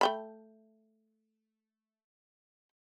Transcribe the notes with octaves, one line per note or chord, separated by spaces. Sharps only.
A3 G5 B5